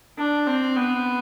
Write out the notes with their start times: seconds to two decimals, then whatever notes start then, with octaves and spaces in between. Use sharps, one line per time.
0.17 D4
0.46 C4
0.75 B3